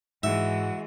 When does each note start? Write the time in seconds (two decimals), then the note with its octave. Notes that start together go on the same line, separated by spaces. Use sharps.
0.23 G#2 E3 G#3 F#4 E5